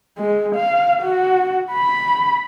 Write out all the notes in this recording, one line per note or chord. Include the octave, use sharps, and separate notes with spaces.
G#3
F5
F#4
B5